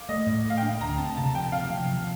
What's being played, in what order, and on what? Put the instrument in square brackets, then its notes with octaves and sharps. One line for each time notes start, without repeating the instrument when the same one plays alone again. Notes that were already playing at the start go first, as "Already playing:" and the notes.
Already playing: [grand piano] F5 D6
[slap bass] A3 [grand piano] D#5
[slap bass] A2
A3
[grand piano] F5
[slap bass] D4 [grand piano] G5
[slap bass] D2 [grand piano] A#5
[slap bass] C4 [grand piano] A5
[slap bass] C3 [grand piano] A5
[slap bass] F3 [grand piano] G5
[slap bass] C3 [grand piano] F5
[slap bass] F3
F3